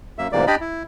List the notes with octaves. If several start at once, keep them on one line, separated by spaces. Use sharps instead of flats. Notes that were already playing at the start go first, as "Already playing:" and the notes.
F#2 A#3 E5
D2 G#2 C3 E3 A#3 D5
D4 G4 D5 D#5 B5
E4